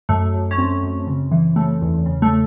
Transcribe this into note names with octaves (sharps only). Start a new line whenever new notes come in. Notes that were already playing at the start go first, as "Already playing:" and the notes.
F#2 A3
F#2
C#4
F#2 C4
F#2
C#3
E3
C#3 A3
E2
C#3
A3